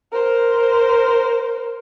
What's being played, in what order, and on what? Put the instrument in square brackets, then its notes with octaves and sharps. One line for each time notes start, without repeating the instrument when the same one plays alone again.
[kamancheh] A#4 C5